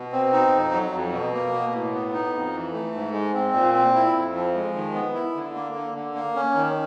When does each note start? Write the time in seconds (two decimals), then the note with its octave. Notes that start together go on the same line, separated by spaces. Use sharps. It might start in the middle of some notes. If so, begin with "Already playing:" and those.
Already playing: B2
0.13 C4
0.33 D#4
0.52 F2
0.72 F#3
0.93 F2
1.12 B2
1.33 A#3
1.53 B2
1.73 A2
1.93 B3
2.13 D#4
2.33 F2
2.53 E3
2.73 A3
2.94 G#2
3.13 G#3
3.34 C4
3.54 A#2
3.74 C4
3.95 E4
4.14 F2
4.34 F3
4.55 G#3
4.74 D#3
4.94 B3
5.14 E4
5.35 D3
5.55 A#3
5.75 D3
5.95 D3
6.15 A#3
6.36 C#4
6.55 D#3